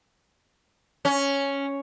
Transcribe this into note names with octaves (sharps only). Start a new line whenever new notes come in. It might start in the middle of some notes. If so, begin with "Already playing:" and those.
C#4